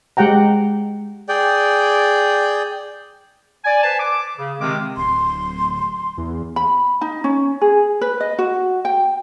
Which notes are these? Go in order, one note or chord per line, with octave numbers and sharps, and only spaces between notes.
G#3 G4 F#5 G5 A#5
G#4 D5 G5
D5 G#5
B4 C5 G#5 A5
D6
C#3
C3 D#3 G#3 C4 D6
D1 C6
E2
B5
D#4
C#4
G#4
B4
D#5
F#4
G5